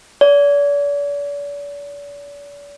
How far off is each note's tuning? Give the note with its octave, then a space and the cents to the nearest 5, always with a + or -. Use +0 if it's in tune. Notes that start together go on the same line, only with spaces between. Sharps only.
D5 -40